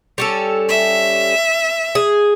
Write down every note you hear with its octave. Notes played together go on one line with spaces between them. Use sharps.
G3 C#4 A4
E5
G#4